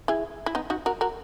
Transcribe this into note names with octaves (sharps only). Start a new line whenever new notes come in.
E4 G#4
E4
B3 D#4
D#4 F#4
F#4 A#4
F#4 A#4